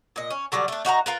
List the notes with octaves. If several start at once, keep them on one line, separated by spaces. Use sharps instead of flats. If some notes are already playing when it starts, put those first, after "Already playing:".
A#2 D#5
C#4
D3 F#3 G3 D4
A3 D4
D#4 F#4 B4 A#5
F4 A#4 B4